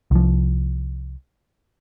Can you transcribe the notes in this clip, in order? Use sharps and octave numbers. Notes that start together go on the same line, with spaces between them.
C2 F3